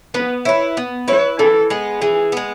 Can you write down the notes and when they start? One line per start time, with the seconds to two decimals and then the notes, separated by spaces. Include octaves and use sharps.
0.14 B3 B4
0.45 E4 B4 C#5
0.77 B3
1.08 E4 B4 C#5
1.39 E3 A4
1.70 G#3 B3
2.01 E3 G#4
2.32 G#3 B3